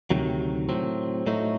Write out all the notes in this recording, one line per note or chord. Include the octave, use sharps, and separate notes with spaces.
D2 C3 D#3 F#3
A2 F#3 C4
A2 F#3 A3 D#4